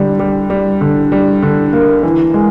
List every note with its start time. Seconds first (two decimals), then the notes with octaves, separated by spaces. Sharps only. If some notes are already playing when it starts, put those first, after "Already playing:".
Already playing: D3 G3
0.19 G3
0.50 G3
0.81 D3
1.12 G3
1.43 D3
1.73 A#3
2.03 E3
2.34 G#3